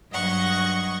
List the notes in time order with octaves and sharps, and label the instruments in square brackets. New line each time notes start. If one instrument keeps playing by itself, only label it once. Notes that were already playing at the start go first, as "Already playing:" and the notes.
[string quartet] G2 F#3 D#5 F#5 C#6